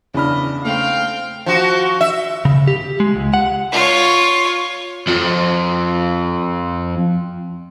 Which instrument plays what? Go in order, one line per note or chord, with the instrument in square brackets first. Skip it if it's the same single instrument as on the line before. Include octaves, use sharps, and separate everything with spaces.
[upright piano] E2 D4 F6 [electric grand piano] C#3 B5 [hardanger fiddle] D#5
[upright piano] A3 [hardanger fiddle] C4 G5 [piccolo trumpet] F5
[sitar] F3 F#4
E5
[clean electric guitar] C#3
G4
G#3
C#2
F#5
[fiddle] F4 C#5
[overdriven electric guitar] F2 F3